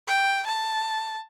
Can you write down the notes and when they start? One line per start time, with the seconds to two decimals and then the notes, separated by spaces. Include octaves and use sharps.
0.08 G5
0.47 A5